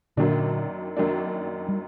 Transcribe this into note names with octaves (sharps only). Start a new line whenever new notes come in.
F#2 A#2 D3 D#3 F#3 A#3 D4
F#2 D#3 F#3 A#3 D4
G3